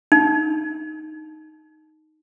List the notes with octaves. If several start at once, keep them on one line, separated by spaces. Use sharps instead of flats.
D#4